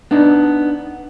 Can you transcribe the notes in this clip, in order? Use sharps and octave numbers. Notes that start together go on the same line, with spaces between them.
B3 D4 D#4